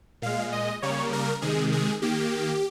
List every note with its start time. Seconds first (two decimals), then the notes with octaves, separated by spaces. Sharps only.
0.22 A#2 G#3 F5
0.52 D#5
0.82 C#3 G3 A#3 C#5
1.13 A#4
1.42 C3 D#3 G#3 G#4
1.72 G#4
2.02 D#3 A#3 G4